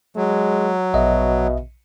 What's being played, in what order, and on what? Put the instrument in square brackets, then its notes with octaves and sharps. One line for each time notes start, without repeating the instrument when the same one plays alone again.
[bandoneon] F#3 [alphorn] G#3
[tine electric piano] A#1 D#5 E5 [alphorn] B2